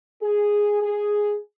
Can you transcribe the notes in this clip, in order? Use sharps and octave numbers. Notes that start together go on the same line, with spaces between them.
G#4
G#4